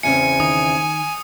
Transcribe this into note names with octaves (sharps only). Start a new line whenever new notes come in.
E2 C#3 C4 G#5 C#7
D#3 D#6